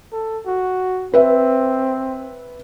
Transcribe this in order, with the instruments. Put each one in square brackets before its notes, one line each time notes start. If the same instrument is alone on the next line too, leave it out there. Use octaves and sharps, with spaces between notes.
[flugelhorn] A4
F#4
[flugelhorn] C4 [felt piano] B4 E5